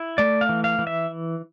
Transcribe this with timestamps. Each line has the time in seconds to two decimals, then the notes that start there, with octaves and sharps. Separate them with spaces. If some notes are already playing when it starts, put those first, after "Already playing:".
Already playing: E4
0.18 A3 D5
0.41 F5
0.49 E3
0.64 F5
0.79 E3
0.87 E5